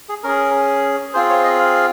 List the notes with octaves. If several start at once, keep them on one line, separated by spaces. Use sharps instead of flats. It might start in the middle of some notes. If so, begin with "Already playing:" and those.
G#4
C#4 G#4 A#4
C4 F4 G#4 C5
C#5
D#5
F5